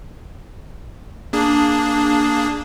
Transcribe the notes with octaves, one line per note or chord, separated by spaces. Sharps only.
A#3 D4 G#4